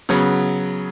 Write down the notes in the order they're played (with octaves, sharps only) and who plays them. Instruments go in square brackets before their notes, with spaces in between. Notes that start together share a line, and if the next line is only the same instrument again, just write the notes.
[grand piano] C#3 F#3 B3